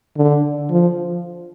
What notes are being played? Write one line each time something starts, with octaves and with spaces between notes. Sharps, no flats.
D3
F3